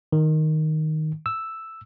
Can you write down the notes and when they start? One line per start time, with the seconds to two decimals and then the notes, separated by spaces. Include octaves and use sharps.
0.12 D#3
1.26 E6